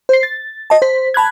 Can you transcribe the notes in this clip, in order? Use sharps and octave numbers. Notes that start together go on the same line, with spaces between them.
C5 C7
A6
D#5 A5
C5 B6
A5 B5 F#6 G#6